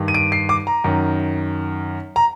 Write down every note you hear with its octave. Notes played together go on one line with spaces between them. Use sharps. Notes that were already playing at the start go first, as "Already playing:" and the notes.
Already playing: G2 D#3
D#7
D7
C7
D6
A#5
F#2 D#3
A#5